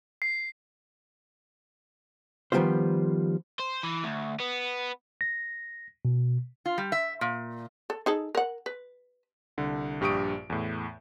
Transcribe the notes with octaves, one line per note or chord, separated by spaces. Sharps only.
C7
D#3 F3 G3 B3 F4 C5
C5
E3
D2
B3
A#6
B2
F4
G3
E5
A#2
A4
D#4 G#4 A4
A#4 F#5
B4
C2 D3
A#1 G2 G4 C#6 D#6 D7
E2 A2